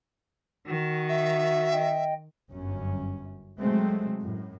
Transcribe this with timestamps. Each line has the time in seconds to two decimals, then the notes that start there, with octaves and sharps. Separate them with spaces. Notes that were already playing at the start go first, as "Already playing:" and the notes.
0.67 D#3 F#4
1.09 E5
1.71 D#5 G5
2.50 G1 F#2 C#4
3.59 C3 F#3 G#3 A3 C4
4.20 F#2 A2